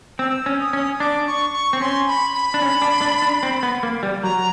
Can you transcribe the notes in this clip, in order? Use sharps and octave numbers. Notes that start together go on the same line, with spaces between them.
C4 E6
C#4
D#6
C#4
D4 D6
C#6
C#6
C4
C#4 C6
B5
B5
D4
C#4
D4
D4
D4
C4
B3
A#3
G3
F#3 A#5